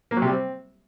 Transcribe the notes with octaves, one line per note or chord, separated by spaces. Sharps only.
A#3
F#3
C3
G3
C4